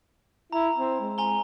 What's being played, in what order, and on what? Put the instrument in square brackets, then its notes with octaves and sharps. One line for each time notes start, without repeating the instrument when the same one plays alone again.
[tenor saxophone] E4 [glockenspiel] A#5
[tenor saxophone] C4
G#3
[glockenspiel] G#5 A#5 G7